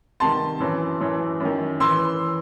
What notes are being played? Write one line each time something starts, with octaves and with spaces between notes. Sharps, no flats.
C2 C3 D#3 A5 C6
F#2 E3
F#2 E3
F#2 D#3
E3 C6 E6